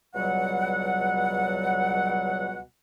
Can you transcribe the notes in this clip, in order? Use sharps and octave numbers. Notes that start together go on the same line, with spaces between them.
C#2 B2 F#3 G3 F#5